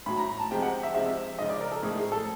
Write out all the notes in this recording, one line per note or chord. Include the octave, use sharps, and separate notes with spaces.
A2 F#3 B5
A#5
A#5
A5
C3 F3 G#3 G5
F#5
E5
C3 F3 G#3 E5
C#3 F3 G#3 D#5
D5
A#4
A4
A2 F3 G#3 G#4
G#4
A4